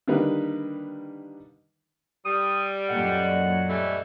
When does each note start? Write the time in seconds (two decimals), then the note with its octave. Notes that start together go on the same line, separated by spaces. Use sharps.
0.08 D3 D#3 G3 A#3 D#4 B4
2.25 G3 D#6
2.89 F#2 A#2 A4 D5 D#5 F#5
3.69 E3 G3 A3